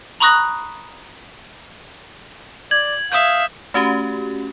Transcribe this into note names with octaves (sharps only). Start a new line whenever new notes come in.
A#5 B5 C#6 D#6 F#6 A#6
D5 G#6 F#7
E5 F5 D#6 G6
A3 C#4 F#4 G4